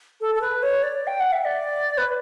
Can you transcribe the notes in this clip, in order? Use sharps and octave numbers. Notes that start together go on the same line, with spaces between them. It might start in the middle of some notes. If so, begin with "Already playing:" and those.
A4
A4
B4
C#5
D5
G5
F#5
E5
D5
B4